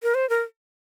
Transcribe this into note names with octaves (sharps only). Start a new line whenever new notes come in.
A#4
C5
A#4